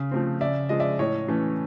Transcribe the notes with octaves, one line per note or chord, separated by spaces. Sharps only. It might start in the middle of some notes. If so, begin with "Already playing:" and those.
Already playing: C#3
F3 A3 C4
C#3 D5 E5
F3 G#3 D#5
D5 E5
A2 C#5 D#5
E3 A3 C#4